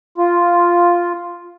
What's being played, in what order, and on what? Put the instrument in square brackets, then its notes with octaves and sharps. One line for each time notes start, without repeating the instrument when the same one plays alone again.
[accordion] F4